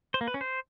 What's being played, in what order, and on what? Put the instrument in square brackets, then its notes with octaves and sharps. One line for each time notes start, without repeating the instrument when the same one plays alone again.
[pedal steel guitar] C5
A#3
B4
C#4
C5